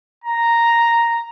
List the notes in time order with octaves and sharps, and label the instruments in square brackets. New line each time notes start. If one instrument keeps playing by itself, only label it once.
[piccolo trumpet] A#5